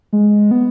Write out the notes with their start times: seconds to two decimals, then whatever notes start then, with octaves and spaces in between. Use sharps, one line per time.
0.13 G#3
0.51 B3